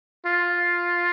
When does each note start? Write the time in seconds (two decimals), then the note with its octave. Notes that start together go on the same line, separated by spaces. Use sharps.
0.26 F4